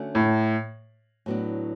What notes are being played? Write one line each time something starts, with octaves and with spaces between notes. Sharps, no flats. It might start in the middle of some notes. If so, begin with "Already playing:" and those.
Already playing: D3 A3 C#4 F#4 A4
A2
A2 F#3 B3 D4